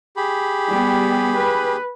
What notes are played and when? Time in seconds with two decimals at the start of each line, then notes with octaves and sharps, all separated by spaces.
0.17 G4 G#4 B5
0.68 G3 B3
1.37 B4